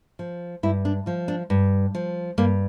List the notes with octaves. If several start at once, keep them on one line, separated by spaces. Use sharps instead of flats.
F3
G2 E4
D4
F3 F4
D4
G2
F3
G2 A#3